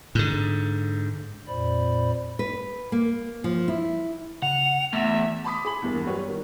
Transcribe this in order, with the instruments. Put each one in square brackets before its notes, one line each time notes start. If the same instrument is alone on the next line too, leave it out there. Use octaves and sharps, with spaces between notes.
[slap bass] G#2 D3
[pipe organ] F2 A#2 C5 D5 B5
[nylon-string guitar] B4
A#3
F3
E4
[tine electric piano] C#3 [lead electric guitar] F#5 [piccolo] F7
[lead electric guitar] E2 [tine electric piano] A3 [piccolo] E5
[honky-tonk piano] A5 B5 C6 D6 D#6 B6
G#4 B5 F#7
E2 G2 A#3
F#3 G3 F#4 G4 B4 C#5
D#3 G3